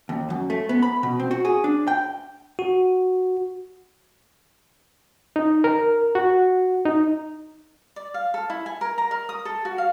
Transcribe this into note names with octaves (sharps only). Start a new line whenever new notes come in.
D#2
F#2
A3
B3
B5
B2
C4
F#4
G#4
D4
G5
F#4
D#4
A#4
F#4
D#4
D5
F5
A4
E4
G#5
A#4
A#5
A#4
D#6
A4
F#4
F5